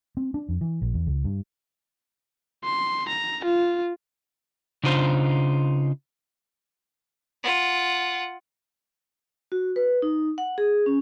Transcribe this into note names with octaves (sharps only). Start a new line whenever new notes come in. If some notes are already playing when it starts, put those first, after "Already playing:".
C4
D4
F2
E3
A#1
E2
C#2
G2
C6
A#5
F4
C#3 D4 D#4 F4 C5
F4 F#5
F#4
B4
D#4
F#5
G#4
C#4